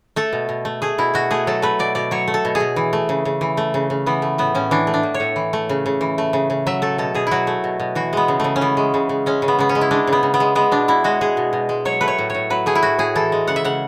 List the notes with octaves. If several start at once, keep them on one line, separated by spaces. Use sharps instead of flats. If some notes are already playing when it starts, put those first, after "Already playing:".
A3 A4
B2
B2
A3
A3 G#4
B2 E4
B2 F#4
A3 G#4
F#3 A4
A3 B4
B2 D5
B2 D5
F#3 C#5
A3
A4
B2
G#4
B2
E3
A3
C#3
C#3
E3
A3
C#3
C#3
E3 B3
A3
A2 B3
A2 C#4
E3 D4
A3
D4
A2
C#5
A2
E3
A3
C#3
C#3
E3
A3
C#3
C#3
F#3 E5
A3 A4
B2 A4
B2 G#4
F#3 E4 F#4
A3
B2
B2
E3 F#4
G#3 B3
C#3
C#3 A3
C#4
E3 B3
G#3
C#3
C#3
G#3 C#4
C#3
B3
C#3 B3
C#4
G#3
E4
G#3 D4
C#3
B3
C#3
B3
G#3
G#3 B3
B2 D4
B2 E4
G#3 F#4
G#3 G#4
B2
B2
G#3
F#3 C#5
A3 B4
C#5
A2
A2 C#5
F#3 B4
A3 G#4
E4
A2 F#4
A2 G#4
E3 A4
G#3
C#3 F#5
E5
C#3 F#5